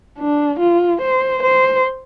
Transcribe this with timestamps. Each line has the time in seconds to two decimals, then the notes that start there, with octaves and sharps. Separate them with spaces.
0.18 D4
0.60 F4
1.02 C5
1.43 C5